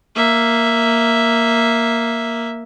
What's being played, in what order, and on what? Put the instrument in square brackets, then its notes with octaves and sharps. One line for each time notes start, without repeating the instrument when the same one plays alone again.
[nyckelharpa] A#3 E5